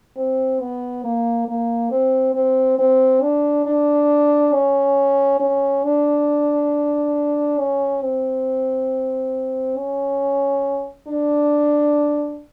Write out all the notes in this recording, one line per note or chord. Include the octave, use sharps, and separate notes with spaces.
C4
B3
A#3
A#3
C4
C4
C4
D4
D4
C#4
C#4
D4
C#4
C4
C#4
D4